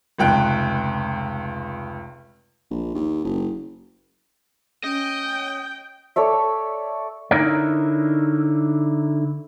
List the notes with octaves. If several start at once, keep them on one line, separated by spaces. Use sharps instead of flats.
F1 C#2 G5 F#6
A#1
D#2
F#1
C#4 D#5 G5
A4 C#5 D5 E5
D3 D#4 E4 A#4 C#5 D5